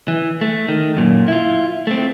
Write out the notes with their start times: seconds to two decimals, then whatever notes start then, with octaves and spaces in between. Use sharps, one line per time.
0.08 E3
0.41 A3
0.68 D#3
0.97 F#2 A#2
1.28 E4 F4
1.87 A3 C4